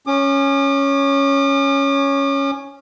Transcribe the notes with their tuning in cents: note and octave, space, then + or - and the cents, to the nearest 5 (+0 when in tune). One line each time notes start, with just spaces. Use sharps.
C#4 +0 D6 +40